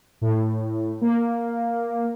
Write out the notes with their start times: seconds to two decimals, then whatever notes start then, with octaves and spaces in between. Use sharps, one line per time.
0.21 A2
1.01 A#3